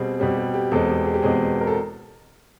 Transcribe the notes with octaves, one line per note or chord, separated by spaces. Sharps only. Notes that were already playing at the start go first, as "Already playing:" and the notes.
Already playing: B2 G3 C4 G#4
B2 G3 C4 G4
G4
G4
E2 B2 G#3 C4 A4
G4
G#4
G4
E2 B2 G#3 C4 G#4
A#4
A4